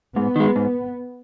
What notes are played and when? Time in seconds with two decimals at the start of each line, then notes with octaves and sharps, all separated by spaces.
0.16 G#2 B3
0.36 D#3 G#3
0.56 G#2